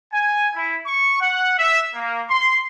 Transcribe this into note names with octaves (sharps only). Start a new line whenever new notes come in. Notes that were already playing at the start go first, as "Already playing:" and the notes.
G#5
E4
C#6
F#5
E5
A#3
C6